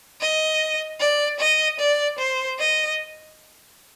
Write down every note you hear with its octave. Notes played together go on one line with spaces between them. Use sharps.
D#5
D5
D#5
D5
C5
D#5